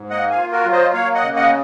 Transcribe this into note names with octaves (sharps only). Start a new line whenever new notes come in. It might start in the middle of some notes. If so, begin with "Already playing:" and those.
Already playing: G#2
A#3 D#5 F#5
F5 G#5
F4
F#4 A#4
F#3
C5 D#5
A#3 C#5 F5
D#5 F#5
C#3
D#5 F#5